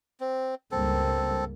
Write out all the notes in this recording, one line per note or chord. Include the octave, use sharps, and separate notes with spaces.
C4
C#2 G2 A#3 C4 A4